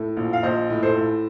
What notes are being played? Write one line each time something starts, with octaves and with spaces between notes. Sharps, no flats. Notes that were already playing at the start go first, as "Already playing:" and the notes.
Already playing: A2 A4
A#1
F5
A#1 C5 D#5
A2
A4 C5
A2